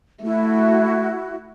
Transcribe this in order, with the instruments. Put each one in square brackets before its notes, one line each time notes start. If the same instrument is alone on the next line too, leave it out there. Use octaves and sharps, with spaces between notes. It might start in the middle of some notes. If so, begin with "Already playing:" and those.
[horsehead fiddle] A3 [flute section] E4 F#4